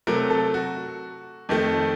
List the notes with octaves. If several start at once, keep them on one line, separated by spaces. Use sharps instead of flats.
C3 F#3 A3 A#4
A4
F#4
F2 D#3 A3